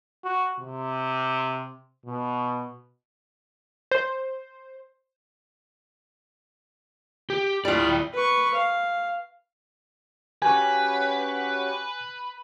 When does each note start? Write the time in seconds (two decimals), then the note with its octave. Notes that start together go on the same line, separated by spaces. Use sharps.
0.24 F#4
0.60 C3
2.06 B2
3.91 C5
7.30 G4
7.65 G3 E4 F4 D5
8.14 B4 C#6
8.54 F5
10.42 C#4 F#4 G4 B4 G#5